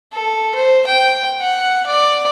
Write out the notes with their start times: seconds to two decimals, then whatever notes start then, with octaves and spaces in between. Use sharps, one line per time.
0.13 A4
0.55 C5
0.87 G5
1.41 F#5
1.86 D5